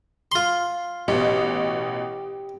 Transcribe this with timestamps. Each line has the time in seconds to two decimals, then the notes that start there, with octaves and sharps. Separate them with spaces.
0.32 F4 C6
1.08 A1 B2 G4